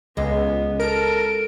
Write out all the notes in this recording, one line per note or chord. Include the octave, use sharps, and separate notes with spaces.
C#2 G#3 B3
A4 A#4 D7